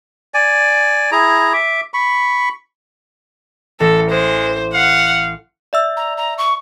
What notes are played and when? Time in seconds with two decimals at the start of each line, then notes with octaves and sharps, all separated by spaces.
0.34 D5 G#5
1.12 E4 G#4 A#5
1.53 E5 D6
1.94 B5 C#6
3.80 A1 A4 A#6
4.10 G#3 C5
4.74 F5 F#5
5.73 D5 E5 E6
5.97 A#5
6.17 A#5
6.38 C#6